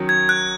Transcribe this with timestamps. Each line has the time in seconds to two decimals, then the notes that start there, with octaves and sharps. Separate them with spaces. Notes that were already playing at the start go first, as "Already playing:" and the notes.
Already playing: D#3 F#3 C#4
0.09 G#6
0.29 F#6